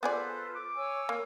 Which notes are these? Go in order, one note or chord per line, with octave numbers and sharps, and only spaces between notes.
B3 F4 G#4 A4 B4 C5 D5
D6
C#5 G#5 E6
A#3